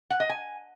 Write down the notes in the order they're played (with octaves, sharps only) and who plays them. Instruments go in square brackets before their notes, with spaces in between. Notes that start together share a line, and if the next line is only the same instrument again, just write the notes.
[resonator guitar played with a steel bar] F#5
D#5
G#5